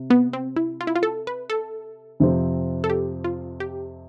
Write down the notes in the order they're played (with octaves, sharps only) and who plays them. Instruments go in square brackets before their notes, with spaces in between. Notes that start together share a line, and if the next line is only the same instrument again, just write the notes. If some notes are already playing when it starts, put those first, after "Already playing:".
Already playing: [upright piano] C3
[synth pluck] B3
C4
E4
F4
E4
F4
A4
B4
A4
[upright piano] F2 C3 F3 C4
[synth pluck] A4
G4
F4
G4